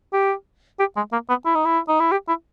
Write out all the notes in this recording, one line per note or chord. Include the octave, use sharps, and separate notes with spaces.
G4
G4
G#3
A#3
B3
E4
D#4
E4
D#4
E4
G4
E4